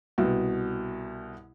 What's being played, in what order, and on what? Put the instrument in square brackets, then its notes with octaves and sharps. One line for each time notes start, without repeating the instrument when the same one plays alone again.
[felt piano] C2 B2